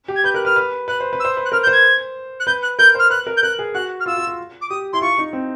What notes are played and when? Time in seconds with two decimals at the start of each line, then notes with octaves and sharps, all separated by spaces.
0.08 G4
0.16 G#6
0.24 B4 G6
0.34 A#4 F#6
0.45 B4 F6
0.56 B4
0.88 B4 F#6
1.00 C5
1.13 B4
1.20 E6
1.25 C5
1.37 B4
1.45 F#6
1.52 A#4 F6
1.63 G6
1.67 C5
1.72 G#6
2.40 F#6
2.47 B4 G6
2.62 F#6
2.79 A#4 G6
2.95 C5
2.99 F6
3.10 B4 F#6
3.27 A#4
3.37 G6
3.43 A#4 F#6
3.59 G#4
3.74 F#4 F#6
4.00 F6
4.06 F4 E6
4.17 F4
4.27 F4
4.61 D6
4.70 G4 D#6
4.93 E4 C6
5.01 F4 C#6
5.18 D#4
5.33 C4